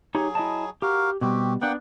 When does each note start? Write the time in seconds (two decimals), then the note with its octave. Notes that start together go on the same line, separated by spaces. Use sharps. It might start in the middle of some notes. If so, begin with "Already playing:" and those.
0.15 F#3 D#4 G4 G#4 C#5
0.35 E4 D#5 A5
0.82 F#4 G4 A#4 F5
1.21 B2 G3 C4 F#4 G4
1.62 A#3 B3 D4 F#5 G5